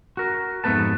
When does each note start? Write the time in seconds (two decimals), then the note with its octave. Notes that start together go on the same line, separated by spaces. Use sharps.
0.17 F#4 A#4
0.64 F2 G#2 A3 B3 B4 A5